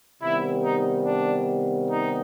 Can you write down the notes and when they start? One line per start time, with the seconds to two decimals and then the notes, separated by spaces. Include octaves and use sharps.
0.22 C3 D#3 G3 B3 E4
0.64 D#4
1.06 D4
1.90 D#4